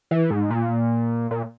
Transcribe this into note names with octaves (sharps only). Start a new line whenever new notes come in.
E3
G#2
A#2
A#2